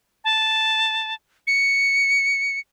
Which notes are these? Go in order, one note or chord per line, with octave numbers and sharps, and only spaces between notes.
A5
C#7